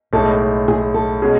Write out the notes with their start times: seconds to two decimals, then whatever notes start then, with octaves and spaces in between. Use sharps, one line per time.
0.13 B1 A2 G#3 A4
0.68 G#4
0.94 A4
1.22 B2 G#3 C#4 G#4